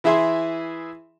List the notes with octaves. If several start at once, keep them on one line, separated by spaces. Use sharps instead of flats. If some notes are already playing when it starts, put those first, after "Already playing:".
E3 E4 G#4 E5 C6